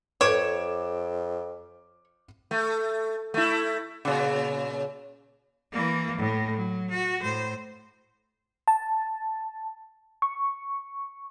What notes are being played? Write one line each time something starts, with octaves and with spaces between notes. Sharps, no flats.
F2 A4 B4 C#5 D6 D7 E7
A3
A3 E4
A#2 C#3
E3 A#3
A2
F#3
F#4
A2 C5
A5
C#6